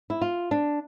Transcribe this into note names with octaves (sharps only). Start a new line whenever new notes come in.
E4
F4
D4